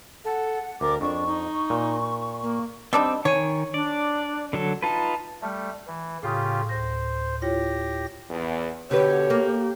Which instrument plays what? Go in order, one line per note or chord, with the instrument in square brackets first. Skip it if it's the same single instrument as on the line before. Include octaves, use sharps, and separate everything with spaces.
[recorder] A4 [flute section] F#5
[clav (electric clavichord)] D2 [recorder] A#4 [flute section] D5 D6
[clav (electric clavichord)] F2 [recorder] D4 [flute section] C#6
[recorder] D#4
[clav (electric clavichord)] A#2
[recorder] A#3
[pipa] G3 D4 D#4 [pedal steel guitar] C4 E6
[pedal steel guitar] D#3 G#5 [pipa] C#5
[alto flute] D4 [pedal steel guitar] D5
[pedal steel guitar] D3 F#3 A4
[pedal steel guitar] D#4 F4 B4 [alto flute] A5
[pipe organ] G3 A3 [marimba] A5 F6
[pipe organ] E3
[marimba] A2 D#6 [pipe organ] C#3 F4 G4
[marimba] D2 A#6 [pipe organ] C5
[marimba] E4 F4 C#5 [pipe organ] G4 A#6
[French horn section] E2
[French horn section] B2 C#5 [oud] D3 B4 [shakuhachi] G4
[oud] A#3